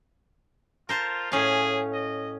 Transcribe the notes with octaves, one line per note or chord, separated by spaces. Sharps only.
F4 A#4 C5 A5
A2 C#4 G#4 F5
D#5